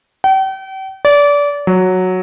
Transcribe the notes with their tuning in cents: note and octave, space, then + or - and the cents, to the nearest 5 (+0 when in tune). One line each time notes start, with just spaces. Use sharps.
G5 -40
D5 -25
F#3 -5